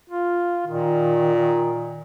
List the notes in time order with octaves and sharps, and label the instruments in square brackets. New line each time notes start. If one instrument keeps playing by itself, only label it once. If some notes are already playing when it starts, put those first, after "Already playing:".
[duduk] F4
[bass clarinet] A#2 [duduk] D#3